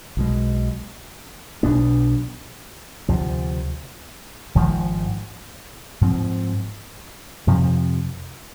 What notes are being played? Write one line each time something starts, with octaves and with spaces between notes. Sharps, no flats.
B1 B2 G#3
B1 B2 B3 D4
D2 C3 F3
G#1 G#2 F3
G#2 F3 C4
F2 C3 F3